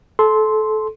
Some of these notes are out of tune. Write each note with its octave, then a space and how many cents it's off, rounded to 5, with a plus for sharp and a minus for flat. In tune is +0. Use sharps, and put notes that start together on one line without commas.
A4 -25 C6 +0